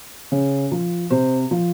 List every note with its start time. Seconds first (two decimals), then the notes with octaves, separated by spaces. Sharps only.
0.32 C#3
0.72 F3
1.10 C3 C5
1.51 F3